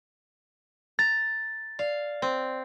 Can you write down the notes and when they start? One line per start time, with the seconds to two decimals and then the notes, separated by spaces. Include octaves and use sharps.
0.99 A#5 A6
1.79 D5 F5
2.22 C4